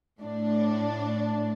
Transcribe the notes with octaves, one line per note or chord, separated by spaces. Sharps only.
A2 D4